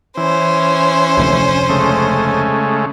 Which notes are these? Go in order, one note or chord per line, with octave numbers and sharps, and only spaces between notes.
E3 C#4 C5
F1 D2
C#3 G#3 A3